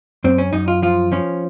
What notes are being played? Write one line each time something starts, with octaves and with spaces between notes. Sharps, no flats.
F#2 C4
C#4
F#2 D#4
F4
F3 F4
F3 C#4